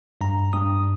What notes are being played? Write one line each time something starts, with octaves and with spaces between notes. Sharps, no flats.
G2 A#5
G2 D#6